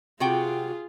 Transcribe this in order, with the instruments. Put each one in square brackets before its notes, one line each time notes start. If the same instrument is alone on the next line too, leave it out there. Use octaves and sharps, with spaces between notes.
[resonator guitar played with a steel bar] C3 F#4 G5 [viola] F4 G#4